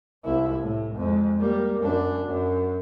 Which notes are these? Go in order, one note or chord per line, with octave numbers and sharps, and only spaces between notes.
C2 E4
A2
F2 G#3
G3 A#3
F#2 D4
F#2